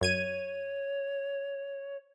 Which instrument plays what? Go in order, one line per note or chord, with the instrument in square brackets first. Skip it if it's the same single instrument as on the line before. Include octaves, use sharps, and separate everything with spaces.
[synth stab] F#2 G#6 D#7 [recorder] C#5